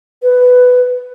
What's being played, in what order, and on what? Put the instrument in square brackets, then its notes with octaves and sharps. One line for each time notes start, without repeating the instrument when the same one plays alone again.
[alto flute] B4